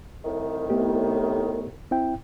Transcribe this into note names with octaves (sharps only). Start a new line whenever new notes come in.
C2 A2 D#3
A3 B3 G4
C4 E4 G5